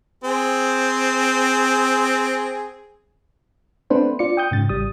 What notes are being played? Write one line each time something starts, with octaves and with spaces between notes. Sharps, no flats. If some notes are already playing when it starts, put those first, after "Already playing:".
C4 G#4
A3 B3 C4 D4 B4 C5
F4 D5 C#7
G5 D#6 G6
G#2 C#3 A6
A1 G3 D#6